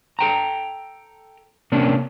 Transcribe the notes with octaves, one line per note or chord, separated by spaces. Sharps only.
A4 G5 A#5
C3 A#3 C#4 D4